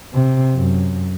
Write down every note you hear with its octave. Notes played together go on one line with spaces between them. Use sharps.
C3
F#2